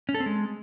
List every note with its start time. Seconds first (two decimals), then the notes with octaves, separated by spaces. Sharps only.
0.09 C#4
0.14 A4
0.20 C4
0.26 G#3